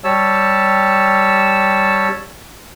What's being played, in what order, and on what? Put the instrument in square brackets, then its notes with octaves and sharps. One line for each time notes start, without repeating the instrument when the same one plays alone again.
[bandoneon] G3 G4 C#5 A5 E6